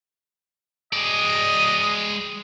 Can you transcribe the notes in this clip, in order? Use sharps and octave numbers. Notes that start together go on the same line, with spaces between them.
G#3 D5 D#5